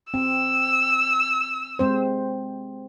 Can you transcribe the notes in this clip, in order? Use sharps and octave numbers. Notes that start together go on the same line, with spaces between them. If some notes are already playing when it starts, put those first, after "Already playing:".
C4 E6
G#3 C4 C5